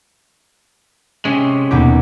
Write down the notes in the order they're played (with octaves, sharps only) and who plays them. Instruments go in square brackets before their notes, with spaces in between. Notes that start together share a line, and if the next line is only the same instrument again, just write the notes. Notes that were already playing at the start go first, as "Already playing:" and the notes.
[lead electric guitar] C3 G#3 [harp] C#4
[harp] D#2 B3 G4 [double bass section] B2